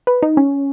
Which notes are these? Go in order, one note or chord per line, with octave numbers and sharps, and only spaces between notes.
B4
D#4
C#4